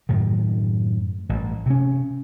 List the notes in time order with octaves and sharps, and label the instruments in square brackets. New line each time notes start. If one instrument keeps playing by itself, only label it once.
[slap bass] F#2 A2 D#3
A1 G2
C3 C#4